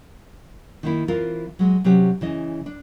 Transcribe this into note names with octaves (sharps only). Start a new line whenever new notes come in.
D#3 A#3 E4
E3 C4 F4 A#4
F#3 G#3
C3 F#3 C#4 G4
C#3 E3 D#5
D4